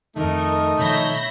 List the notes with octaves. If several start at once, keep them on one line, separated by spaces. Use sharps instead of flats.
F2 D#3 A3 D#4 A#4
B2 D#3 F3 C#5 E5 B5 G6 A#6